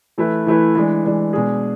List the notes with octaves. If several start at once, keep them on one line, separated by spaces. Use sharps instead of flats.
E3 A3 E4 B4
E3 A3 E4 B4
E3 G#3 D4
E3 G#3 D4
B2 G#3 D4 G#4